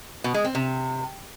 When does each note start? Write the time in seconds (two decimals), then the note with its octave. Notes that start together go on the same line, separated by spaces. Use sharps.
0.24 B2
0.34 G#3
0.45 C4
0.55 C3